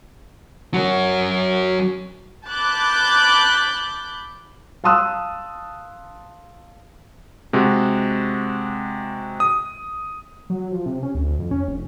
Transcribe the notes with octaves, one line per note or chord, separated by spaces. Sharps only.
F#3 C#4
A5 B5 D6 F#6 G6
F5 A5 C6 D#6 E6 F#6
C3 G#3 F#4
D#6
F#3
F3
C3
C#4
D2
F2
C#4
F1